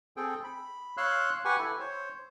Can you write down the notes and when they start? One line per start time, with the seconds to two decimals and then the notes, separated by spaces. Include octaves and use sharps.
0.17 C4 G#4 A4 G5
0.44 B5
0.97 C#5 F5 C6 E6 F#6
1.45 G4 B4 F#5 G#5 C#6
1.59 E4 A4
1.79 C5 C#5